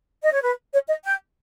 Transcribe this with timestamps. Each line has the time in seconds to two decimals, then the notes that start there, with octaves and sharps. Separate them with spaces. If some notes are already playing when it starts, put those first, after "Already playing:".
0.23 D#5
0.32 C#5
0.42 B4
0.73 C#5
0.88 D#5
1.04 G5